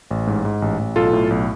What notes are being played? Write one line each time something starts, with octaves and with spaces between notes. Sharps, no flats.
A1
G#2
G#2
A1
A1
B1 F4 A4
A2
B1